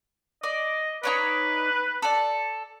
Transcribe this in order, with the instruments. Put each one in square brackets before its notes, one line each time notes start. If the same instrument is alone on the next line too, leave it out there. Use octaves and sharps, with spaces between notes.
[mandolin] D5 [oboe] D#5
[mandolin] D#4 C#5 D5 [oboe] B4
[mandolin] A4 D5